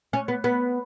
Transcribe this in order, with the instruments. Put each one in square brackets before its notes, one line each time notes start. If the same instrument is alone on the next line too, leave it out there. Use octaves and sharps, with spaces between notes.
[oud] C#4
B3
B3